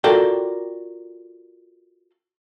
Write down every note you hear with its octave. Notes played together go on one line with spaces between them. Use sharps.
F4 F#4 A4 A#4 D5 G5